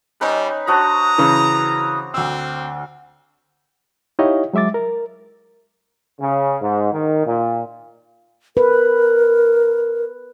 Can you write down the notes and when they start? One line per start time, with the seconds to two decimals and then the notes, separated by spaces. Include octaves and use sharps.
0.21 G3 C#4 D#4 B4
0.67 D4 F#4 C5 A#5 D#6
1.18 C#3 E3
2.14 D2 C4 E6
4.19 D#4 E4 G4 C#5 D#5 F5
4.53 F#3 G#3 E5 D6 A6
4.74 A#4
6.20 C#3
6.62 G#2
6.93 D#3
7.26 A#2
8.57 A#4 B4